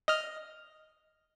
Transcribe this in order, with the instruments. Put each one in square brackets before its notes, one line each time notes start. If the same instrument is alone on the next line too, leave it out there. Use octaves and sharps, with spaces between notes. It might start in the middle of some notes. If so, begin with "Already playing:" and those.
[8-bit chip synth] D#5 F6